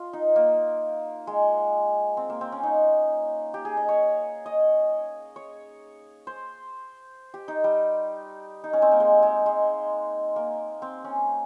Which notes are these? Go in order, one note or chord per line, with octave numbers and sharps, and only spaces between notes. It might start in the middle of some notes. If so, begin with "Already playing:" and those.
Already playing: F4
D#4
A#3
G#3
C4
A#3
C4
C#4
D#4
G4
G#4
D#5
C#5
D#5
C#5
C5
G4
D#4
G3
D#4
C#4
C4
A#3
G#3
G#3
G#3
A#3
C4
C#4